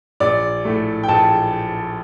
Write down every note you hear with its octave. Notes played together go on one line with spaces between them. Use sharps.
A#1 D5
A2 A3
G5
A#1 A5